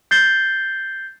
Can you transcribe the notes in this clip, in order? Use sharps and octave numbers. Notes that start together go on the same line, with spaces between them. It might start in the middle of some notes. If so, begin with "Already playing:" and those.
G6 A6 C7 G7